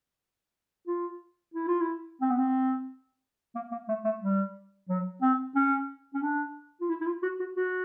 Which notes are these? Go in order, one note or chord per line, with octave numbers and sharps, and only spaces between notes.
F4
E4
F4
E4
C4
B3
C4
A#3
A#3
A3
A3
G3
F#3
C4
C#4
C#4
D4
F4
E4
E4
F4
F#4
F#4
F#4